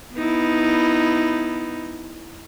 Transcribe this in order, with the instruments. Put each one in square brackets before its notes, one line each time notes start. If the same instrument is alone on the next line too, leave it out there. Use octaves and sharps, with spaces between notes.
[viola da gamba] B3 D#4 E4